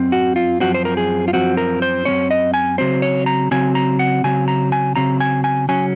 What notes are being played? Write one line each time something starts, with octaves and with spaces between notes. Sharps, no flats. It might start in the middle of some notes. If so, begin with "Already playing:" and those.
Already playing: F#2 C4
F#4
F4
F#2 F3 C4 F#4
C5
A#4
G#4
F4
F#2 F3 C4 F#4
A#4
C5
F#2 F3 C4 C#5
D#5
G#5
C#3 F#3 C4 C5
C#5
A#5
C#3 F#3 C4 G#5
A#5
F#5
C#3 F#3 C4 G#5
A#5
G#5
C#3 F#3 C4 A#5
G#5
G#5
C#3 F#3 C#4 G#5